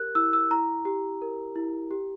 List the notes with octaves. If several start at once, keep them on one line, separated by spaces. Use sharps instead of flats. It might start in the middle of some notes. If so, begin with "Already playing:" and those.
Already playing: G4 A#4 F#6
E4 E6
E6
E4 A#5
G4
A#4
E4
G4